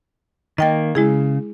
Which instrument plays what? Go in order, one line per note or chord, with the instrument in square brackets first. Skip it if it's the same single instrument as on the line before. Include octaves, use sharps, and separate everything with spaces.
[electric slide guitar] D#3 A#3 [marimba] D#5 G5 A6
[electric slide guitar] C#3 [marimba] G#3 E4 G#4